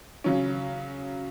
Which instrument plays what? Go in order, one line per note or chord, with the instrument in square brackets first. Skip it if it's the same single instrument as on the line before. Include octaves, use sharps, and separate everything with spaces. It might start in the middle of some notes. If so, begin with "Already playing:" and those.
[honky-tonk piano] C#3 F#3 C#4